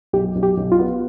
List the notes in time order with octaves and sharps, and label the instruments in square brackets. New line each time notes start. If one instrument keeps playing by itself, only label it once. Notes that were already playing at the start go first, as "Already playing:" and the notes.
[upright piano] B1 [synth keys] G4
[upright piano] B1
[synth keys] G4
[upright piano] B1
[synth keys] F4
[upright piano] B3